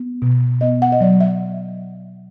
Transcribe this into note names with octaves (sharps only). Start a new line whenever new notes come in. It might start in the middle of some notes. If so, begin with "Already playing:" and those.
Already playing: B3
B2
B3 D#5
F#5
D#5
F#3 D5
E5